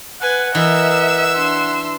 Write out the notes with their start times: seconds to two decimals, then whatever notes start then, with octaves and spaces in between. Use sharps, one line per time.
0.22 B4 F#5 G#5
0.55 E3 A#4 D#5 E5 E6
1.36 D4 C6